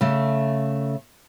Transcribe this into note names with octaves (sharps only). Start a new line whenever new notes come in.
C#3 A3